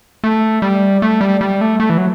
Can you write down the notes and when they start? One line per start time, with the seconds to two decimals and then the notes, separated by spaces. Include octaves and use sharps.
0.24 A3
0.62 G3
1.02 A3
1.21 G3
1.41 G3
1.61 A3
1.80 A3
1.90 E3
1.98 F#3